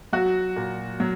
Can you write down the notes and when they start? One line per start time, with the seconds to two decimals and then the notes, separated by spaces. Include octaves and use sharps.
0.13 F#3 F#4
0.56 A#2
1.00 F#3